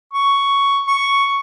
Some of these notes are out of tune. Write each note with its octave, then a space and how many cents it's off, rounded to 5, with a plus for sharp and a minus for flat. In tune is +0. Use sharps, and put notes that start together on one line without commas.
C#6 +5
C#6 +5